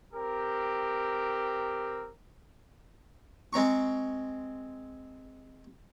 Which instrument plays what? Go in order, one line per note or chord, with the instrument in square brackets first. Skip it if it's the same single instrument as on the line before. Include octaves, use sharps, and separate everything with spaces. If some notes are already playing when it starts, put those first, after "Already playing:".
[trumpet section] C4 G4 A#4
[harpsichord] G#3 C4 A#5 C#6